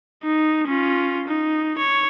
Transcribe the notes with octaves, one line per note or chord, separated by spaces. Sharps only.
D#4
C#4 F4
D#4
C#5